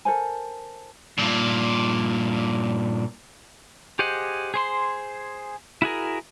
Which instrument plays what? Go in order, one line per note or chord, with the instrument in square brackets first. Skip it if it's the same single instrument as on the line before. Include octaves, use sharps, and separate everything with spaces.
[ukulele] A4 A#4 C5 G#5
[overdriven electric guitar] G2 A#2
[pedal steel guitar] G4 G#4 C5 D#5 F#5
G#4 C5 C6
E4 F#4 G#4 A#4